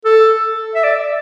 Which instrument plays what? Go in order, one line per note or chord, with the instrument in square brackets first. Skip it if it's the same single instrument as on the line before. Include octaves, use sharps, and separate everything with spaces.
[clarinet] A4
E5
D5